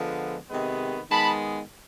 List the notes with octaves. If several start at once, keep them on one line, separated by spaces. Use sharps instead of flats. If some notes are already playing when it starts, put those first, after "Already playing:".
Already playing: D3 F3 G#3 B3
C3 D#3 G#3 B3
D#3 G#3 B3 A5 B5